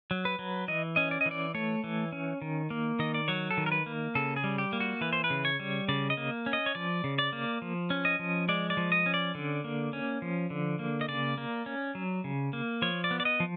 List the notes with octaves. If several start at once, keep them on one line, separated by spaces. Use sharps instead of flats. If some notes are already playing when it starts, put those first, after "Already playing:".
F#3
B4
F#3
E3 D#5
C#4 D#5
D5
D#5
E3
D5
A3 C#5
E3
C#4
D#3
A#3
D#3 D#5
D5
F#3 C#5
A4
D#3
A#4
B4
A#3
C#3 A4
G#4
G3
G4
A#3
F#4
E3 B4
C5
B4
C#3
C#5
G3
C#3 D5
D#5
A#3
C#4
D#5
C#5
F3 D5
C#3
D5
A#3
F3
C#4
D#5
F3
G#3 D5
D5
F3
D#5
C#4
D5
D3
A#3
C#4
F3
D3
A#3
D#5
C#3 D5
A#3
C#4
F#3
C#3
A#3
F3 C#5
D5
B3
D5
D#5
F3